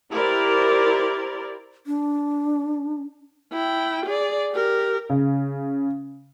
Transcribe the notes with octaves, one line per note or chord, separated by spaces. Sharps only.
E4 G4 A#4 C5 D5
D4
E4 G5
G#4 D5
G4 A#4
C#3